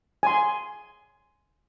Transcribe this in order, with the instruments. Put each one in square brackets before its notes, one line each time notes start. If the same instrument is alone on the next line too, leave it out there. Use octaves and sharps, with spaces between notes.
[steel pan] G#5 C6